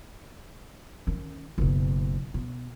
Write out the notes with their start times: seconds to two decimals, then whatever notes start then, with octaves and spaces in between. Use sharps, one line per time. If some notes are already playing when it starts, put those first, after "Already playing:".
1.07 D#3 C#4
1.58 F#1 B2
2.34 B2